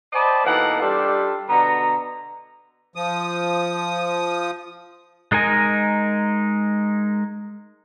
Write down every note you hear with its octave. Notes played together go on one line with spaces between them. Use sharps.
C5 D5 D#5 G5 A5 B5
B2 E3 A#3 D#4 A4 F#5
G3 D4 F4 G4 A4
B2 D3 B3 A#5
F3 D#6
G#3 D#4 A#4 G#5